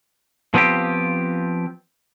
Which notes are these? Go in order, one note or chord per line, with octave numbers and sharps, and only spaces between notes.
F3 B3 C4 F4 G4